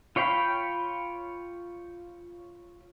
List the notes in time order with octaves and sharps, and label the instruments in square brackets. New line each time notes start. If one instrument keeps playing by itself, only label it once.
[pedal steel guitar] F4 C#5 F5 G5 B5